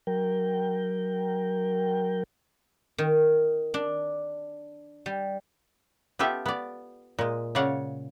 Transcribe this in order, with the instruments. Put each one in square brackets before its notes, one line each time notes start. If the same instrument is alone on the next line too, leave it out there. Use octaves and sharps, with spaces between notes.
[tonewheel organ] F#3 A#4 G5
[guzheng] D#3
D4
G3
[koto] B3 F4 G4 A4 E5
B3 D5
A#2 G#3
C#3 C#5 D5 F5 F#5